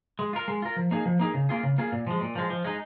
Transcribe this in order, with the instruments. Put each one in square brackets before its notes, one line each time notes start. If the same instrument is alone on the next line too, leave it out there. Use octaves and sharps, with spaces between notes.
[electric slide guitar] G#3
F4 A#4
G#3
F4 A#4
F3
A#3 D#4 G#4
F3
A#3 D#4 G#4
C#3
A#3 F4 G#4
C#3
A#3 F4 G#4
A#2
F3 G#3
A#2
F3 G#3
F3
G#3 D#4